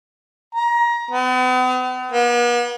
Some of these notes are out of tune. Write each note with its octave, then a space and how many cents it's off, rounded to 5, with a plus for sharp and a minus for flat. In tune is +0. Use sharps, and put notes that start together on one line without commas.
A#5 +25
B3 +45
B3 -45